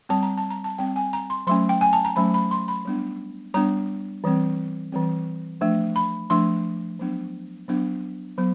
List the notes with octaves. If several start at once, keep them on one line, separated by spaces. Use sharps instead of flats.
G3 C4 A5
A#5
A5
A#5
A5
G3 C4 G5
G#5
A#5
C6
F#3 A3 C#4 C6
G5
G#5
A5
A#5
F#3 A3 C#4 B5
B5
C6
B5
G3 B3 D4
G3 B3 D4 A#5
E3 G3 C4
E3 G3 C4
F3 A3 D4
B5
F3 A3 D4 C6
F#3 B3 D4
F#3 B3 D4
F#3 B3